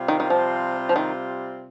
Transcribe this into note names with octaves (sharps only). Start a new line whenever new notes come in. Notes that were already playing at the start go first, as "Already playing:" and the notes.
Already playing: C3 G3 C4 F4
D#3
D#3
F3
F3
D#3